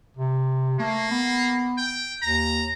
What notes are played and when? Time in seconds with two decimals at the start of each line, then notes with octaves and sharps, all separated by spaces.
0.17 C3
0.80 A3 A#3
1.11 B3
1.77 G5
2.22 D#2 A#5